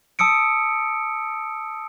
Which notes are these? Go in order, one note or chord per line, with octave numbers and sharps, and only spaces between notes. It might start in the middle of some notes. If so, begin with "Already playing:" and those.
A5 D#6 E6 C#7 D7